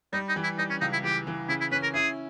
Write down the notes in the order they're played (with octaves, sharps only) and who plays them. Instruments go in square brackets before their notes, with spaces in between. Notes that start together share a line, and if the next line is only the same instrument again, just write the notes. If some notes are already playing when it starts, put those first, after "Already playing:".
[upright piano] G3 [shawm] D#4
[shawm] D#4
[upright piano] E3
[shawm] E4
[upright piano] G3 [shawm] D#4
[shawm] C#4
[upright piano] C#2 [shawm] D#4
[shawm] E4
[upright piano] E3 [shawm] G4
[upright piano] E3
[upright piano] C#3 [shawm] E4
[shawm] E4
[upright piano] C#4 [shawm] B4
[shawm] A#4
[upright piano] E4 [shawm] G#4